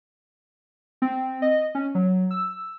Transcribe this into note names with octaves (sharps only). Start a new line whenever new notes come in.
C4
D#5
C#4
F#3
E6